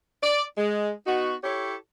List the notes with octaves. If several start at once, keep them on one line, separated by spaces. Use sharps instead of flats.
D5
G#3
B3 D#4 F#4
E4 G4 A4 C#5